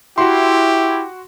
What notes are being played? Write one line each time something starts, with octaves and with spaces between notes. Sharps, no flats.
E4 F#4 G4 C6